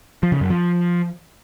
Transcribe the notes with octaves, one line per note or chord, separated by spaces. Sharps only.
F3
C#3
F#2
F3